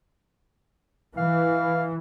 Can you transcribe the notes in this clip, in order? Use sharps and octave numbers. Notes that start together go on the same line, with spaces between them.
E3 F5